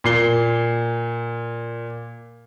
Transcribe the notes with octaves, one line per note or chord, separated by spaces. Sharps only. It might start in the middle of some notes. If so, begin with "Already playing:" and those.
A#2 C7 G7